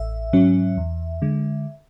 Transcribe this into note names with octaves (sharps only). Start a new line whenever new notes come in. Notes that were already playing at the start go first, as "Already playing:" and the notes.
Already playing: A1 E5
G#2 F#3 C#4
E2
D3 G#3